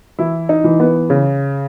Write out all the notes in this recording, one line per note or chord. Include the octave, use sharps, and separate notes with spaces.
E3 E4
D#4
E3
B3
C#3